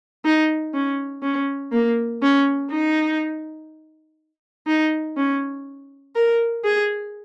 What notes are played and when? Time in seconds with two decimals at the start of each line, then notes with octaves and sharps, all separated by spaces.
0.25 D#4
0.74 C#4
1.22 C#4
1.72 A#3
2.22 C#4
2.71 D#4
4.67 D#4
5.17 C#4
6.15 A#4
6.65 G#4